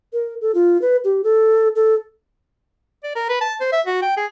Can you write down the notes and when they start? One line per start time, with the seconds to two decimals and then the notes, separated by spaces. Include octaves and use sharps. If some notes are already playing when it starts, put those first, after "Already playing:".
0.13 A#4
0.41 A4
0.55 F4
0.82 B4
1.04 G4
1.24 A4
1.76 A4
3.03 D5
3.16 A#4
3.29 B4
3.41 A5
3.60 C5
3.72 E5
3.86 F#4
4.02 G5
4.17 G#4